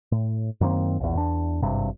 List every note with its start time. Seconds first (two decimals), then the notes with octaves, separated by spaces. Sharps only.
0.12 A2
0.61 F#2 D#3 A#3 C4
1.00 A#1 E2
1.15 E2 D4
1.62 G#1 G2 C3